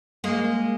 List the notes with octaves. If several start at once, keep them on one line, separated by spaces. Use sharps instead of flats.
G#3 A#3